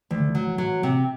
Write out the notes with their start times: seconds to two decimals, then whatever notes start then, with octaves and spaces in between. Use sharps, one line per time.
0.11 D2 E3
0.20 D3
0.29 E3
0.35 F#3
0.47 E3
0.58 F#3
0.83 C3